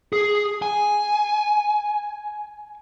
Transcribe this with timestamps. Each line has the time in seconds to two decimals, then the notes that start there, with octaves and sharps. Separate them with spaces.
0.13 G#4
0.62 G#5